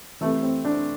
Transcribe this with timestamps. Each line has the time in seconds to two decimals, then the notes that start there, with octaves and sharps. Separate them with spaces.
0.21 C3 E3 A3
0.42 C4
0.65 D4